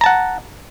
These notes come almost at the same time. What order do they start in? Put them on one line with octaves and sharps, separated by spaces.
A#5 A5 F#5